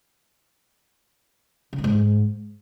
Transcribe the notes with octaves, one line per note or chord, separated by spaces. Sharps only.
C#3
F#2
G#2